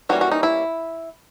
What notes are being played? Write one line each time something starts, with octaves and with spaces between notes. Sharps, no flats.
E3 G3 A#3 C#4 F#4
F#4
D#4
E4